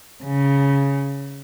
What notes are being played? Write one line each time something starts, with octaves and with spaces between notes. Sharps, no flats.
C#3